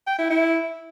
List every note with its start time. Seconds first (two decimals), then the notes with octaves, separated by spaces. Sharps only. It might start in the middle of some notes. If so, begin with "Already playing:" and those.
0.07 G5
0.18 E4
0.30 E4